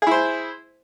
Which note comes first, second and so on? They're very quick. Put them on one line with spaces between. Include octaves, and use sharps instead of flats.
G#4 E4 C5